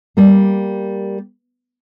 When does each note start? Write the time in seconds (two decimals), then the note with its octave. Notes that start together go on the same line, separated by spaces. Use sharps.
0.17 G3 A#3